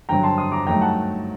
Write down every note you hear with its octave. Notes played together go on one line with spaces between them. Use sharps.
G2 D3 F#3 G5 A#5
A5 C6
C6 D#6
A#5 D6
G2 F#3 A3 D#4 G5 A#5
F#5 A5